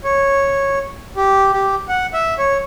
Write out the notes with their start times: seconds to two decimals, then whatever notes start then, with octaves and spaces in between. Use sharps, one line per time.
0.04 C#5
1.16 G4
1.53 G4
1.88 F#5
2.13 E5
2.38 C#5